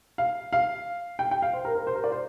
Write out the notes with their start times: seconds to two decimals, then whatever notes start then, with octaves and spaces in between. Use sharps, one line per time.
0.18 F5
0.53 F5
1.19 G5
1.31 G5
1.42 F5
1.53 C5
1.65 A#4
1.75 A#4
1.87 C5
1.95 A#4
2.04 D5
2.12 C5